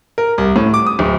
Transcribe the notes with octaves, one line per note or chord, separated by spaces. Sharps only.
A#4
C2
A2
D6
D#6
D1